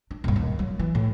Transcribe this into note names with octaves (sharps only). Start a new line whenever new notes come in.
D4
D#1 G2
D#2
F#3
E3
A2